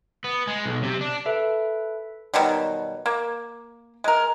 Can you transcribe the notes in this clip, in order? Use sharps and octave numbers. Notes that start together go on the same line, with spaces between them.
B3
G#3
B1
C3
D4
A4 B4 E5
B2 D#3 F#3 G3
A#3
G#3 A#4